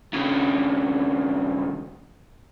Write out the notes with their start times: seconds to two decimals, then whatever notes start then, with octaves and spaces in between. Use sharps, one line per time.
0.13 D#2 C#3